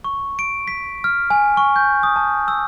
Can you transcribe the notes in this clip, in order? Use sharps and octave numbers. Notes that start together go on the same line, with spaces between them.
C#6
D7
B6
F6
G#5
C#6
G6
D#6
A5
E6